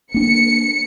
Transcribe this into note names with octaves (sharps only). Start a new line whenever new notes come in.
A#3 D4 C#7